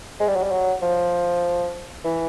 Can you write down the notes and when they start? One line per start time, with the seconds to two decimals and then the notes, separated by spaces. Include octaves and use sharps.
0.20 G#3
0.28 G3
0.36 F#3
0.43 G3
0.52 F#3
0.82 F3
2.04 E3